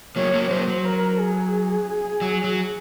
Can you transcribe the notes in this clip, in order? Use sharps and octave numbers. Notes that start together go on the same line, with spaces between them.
F#3 A#3 C#5
F#3 A#3
F#3 A#3 C5
F#3
A#4
G#4
F#3
F#3